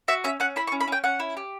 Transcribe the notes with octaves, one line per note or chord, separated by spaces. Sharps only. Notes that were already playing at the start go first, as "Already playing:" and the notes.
F#4 E5
C#4 E5
C#4 F#5
E4 B5
C#6
C#4
B5
C#4 G5
C#4 F#5
E4
G4